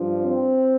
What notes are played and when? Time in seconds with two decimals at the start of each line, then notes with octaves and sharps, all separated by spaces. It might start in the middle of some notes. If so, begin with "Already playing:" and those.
Already playing: G2 F3
0.24 C4